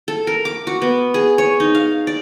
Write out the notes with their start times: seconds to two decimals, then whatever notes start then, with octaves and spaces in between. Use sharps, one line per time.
0.08 A4
0.27 A#4
0.45 D6
0.67 F#4
0.82 B3
1.14 G#4
1.38 C#5
1.60 D#4
1.75 F5
2.07 D5